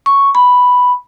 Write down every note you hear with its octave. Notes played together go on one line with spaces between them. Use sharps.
C#6
B5